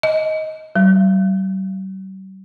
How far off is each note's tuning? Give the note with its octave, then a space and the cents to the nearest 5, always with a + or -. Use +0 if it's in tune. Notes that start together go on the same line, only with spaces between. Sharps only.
D#5 +15
G3 -45